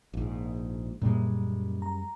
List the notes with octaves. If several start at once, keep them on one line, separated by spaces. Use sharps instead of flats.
A#1 G#2
F#2 A#2 G3 G#3
A#5